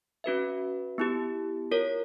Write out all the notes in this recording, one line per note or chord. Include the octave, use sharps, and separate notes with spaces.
C#4 F#4 B4 E5
B3 E4 G4
F4 A#4 C#5